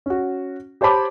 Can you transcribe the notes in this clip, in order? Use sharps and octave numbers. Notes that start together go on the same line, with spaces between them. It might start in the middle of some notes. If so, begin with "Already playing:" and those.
C#4 F#4
G4 C5 C#5 A5 B5 D6